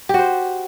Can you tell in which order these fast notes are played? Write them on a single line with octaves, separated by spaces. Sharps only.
G4 F#4 C5